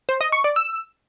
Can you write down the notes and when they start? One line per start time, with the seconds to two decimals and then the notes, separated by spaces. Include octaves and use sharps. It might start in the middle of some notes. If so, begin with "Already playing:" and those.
0.09 C5
0.21 D#5
0.32 C#6
0.44 D5
0.56 E6